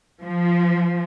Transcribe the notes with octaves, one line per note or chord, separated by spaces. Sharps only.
F3